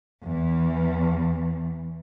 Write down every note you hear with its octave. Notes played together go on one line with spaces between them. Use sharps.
E2 E3